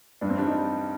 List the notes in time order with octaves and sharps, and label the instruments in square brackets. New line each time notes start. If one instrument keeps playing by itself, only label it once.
[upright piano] G2 D4
C4
G3 D4
D#4